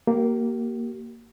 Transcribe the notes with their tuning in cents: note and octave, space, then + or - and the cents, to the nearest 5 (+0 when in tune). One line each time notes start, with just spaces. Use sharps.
A#3 +0 G4 -35